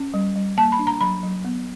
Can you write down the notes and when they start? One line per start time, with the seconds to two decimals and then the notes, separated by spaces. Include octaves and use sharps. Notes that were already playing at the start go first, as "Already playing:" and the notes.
Already playing: C#4
0.14 G3
0.36 G3
0.57 A#3 A5
0.72 B5
0.79 D4
0.87 A#5
1.01 F#3 B5
1.23 F#3
1.45 B3